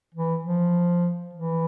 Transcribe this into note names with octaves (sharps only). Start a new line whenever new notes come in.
E3
F3
E3